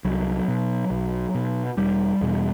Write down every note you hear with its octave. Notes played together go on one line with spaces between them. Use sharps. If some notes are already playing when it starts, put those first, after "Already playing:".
C2 F#3
B2
B1
B2
E1 G3
E2 B2